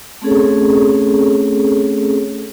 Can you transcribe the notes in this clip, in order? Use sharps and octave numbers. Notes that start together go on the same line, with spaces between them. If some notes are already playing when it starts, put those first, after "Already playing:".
A3 C4 C#4 G#4 A4 C#5